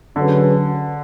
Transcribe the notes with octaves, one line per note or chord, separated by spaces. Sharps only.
D3 F#3 C#4 G#4 B4